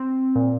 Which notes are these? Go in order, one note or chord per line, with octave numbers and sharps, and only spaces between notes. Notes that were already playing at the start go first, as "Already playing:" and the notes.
Already playing: C4
A#2